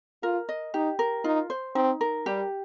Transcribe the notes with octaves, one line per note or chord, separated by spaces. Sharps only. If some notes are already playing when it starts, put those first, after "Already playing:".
F4 A#4
D#5
D#4 G4
A#4
D#4 F4
C5
C4 D#4
A#4
G3 G4